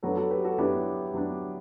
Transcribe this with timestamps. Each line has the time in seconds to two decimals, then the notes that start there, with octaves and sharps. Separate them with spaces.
0.03 F#3 B3 D4 F#4 A4
0.17 F#4 A4
0.30 G4 B4
0.44 F#4 A4
0.58 F#3 B3 D4 E4 G4
1.14 F#3 B3 D4